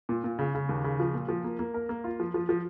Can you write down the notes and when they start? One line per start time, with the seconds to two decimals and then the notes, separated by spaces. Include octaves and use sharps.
0.09 A#2
0.24 A#2
0.39 C#3
0.55 C#3
0.69 D#2
0.84 C#3
1.00 F3
1.14 A#2
1.29 F3
1.44 A#3
1.59 A#3
1.74 A#4
1.89 A#3
2.04 F4
2.20 F3
2.34 F3
2.49 F3